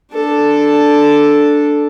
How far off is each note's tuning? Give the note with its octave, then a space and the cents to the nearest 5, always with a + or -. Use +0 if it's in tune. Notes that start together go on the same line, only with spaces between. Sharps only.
D4 +0 A4 +0